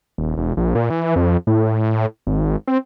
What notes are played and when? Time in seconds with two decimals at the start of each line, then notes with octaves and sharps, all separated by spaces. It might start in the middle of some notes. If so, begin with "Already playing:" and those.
0.18 D#1
0.37 E1
0.57 A#1
0.75 A#2
0.90 E3
1.16 F2
1.47 A2
2.27 G#1
2.68 C4